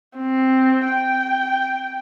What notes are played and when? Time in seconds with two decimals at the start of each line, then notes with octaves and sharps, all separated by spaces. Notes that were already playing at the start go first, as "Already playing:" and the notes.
0.18 C4
0.86 G5